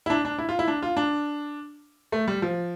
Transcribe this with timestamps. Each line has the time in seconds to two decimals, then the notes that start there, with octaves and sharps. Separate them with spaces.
0.06 E4
0.10 D4
0.25 D4
0.39 E4
0.49 F4
0.59 E4
0.68 D4
0.82 F4
0.97 D4
2.12 A3
2.28 G3
2.42 F3